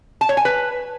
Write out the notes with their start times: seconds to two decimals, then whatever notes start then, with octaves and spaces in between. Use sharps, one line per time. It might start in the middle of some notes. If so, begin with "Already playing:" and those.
0.21 A5
0.29 C#5
0.37 G#5
0.45 B4